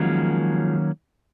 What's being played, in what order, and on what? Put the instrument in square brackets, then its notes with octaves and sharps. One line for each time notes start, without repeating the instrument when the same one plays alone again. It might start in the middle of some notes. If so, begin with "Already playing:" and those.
Already playing: [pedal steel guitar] D#3 F#3 A#3 C#4 [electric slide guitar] F3 G#3